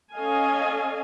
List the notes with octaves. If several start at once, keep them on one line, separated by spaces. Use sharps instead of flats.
C#4 A4 D#5 F5 G#5